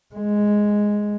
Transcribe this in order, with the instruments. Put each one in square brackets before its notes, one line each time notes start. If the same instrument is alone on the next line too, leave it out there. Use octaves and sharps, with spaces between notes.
[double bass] G#3